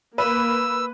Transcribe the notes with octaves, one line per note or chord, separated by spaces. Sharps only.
A#3 B4 E6